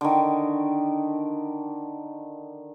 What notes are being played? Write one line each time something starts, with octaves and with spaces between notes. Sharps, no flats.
D3 D#3